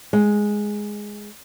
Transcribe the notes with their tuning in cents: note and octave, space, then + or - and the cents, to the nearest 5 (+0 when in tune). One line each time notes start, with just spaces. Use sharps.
G#3 +0